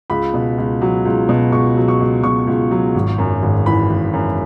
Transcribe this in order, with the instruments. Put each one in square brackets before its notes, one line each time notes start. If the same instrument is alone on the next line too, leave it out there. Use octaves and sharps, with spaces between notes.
[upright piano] C#2 B5
B2
C#2
F#3
C#2
B2
C#2 C#6
F#3
C#6
C#2
B2 C#6
C#2
F#3
G#1
F#2
G#1
E3 B5
G#1
F#2